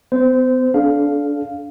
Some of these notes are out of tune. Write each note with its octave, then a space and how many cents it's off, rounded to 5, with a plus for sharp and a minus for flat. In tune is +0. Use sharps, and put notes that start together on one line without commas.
B3 +40 C5 -20
D4 -20 A4 -30 F5 +0